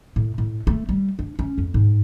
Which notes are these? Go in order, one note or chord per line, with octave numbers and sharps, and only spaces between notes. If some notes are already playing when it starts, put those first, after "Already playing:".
A2
A2
A3
G3
D4
C#4
F2
G#2